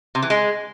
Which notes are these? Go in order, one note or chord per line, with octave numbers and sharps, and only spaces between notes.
C3
E3
G#3